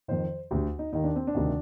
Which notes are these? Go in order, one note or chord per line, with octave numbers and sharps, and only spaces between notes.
F2 D#3 C5
D2 D3 G4
D#4
D#2 D#3 D#4
D4
C4
D4
D2 C3 D#3